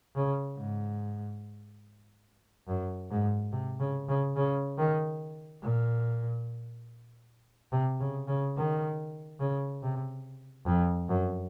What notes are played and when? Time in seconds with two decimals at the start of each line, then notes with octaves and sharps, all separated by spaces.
0.16 C#3
0.57 G#2
2.68 F#2
3.11 G#2
3.52 C3
3.80 C#3
4.09 C#3
4.36 C#3
4.78 D#3
5.63 A#2
7.72 C3
8.00 C#3
8.28 C#3
8.57 D#3
9.40 C#3
9.83 C3
10.66 F2
11.09 F#2